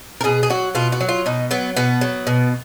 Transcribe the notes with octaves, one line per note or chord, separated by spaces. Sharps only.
A#4
B2 G#4
G#4
F#3 F#4
B2 F4
F#4
F#3
F4
B2 D#4
F#3 B3
B2 B3
F#3
B2